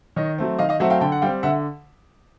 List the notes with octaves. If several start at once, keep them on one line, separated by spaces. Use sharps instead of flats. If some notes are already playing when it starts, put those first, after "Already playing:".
D#3 C#5 D#5
F#3 A3 C4
D#3 D#5 F5
D#5 F5
F#3 A3 C4 E5 F#5
F5 G5
D3 G5 A5
F#5
G3 C4 F5 G5
D3 E5 F#5